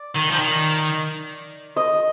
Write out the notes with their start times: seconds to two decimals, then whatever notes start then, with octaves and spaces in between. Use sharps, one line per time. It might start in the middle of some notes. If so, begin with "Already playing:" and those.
Already playing: D5
0.16 D#3
0.31 F3
0.39 D#3
1.76 D#5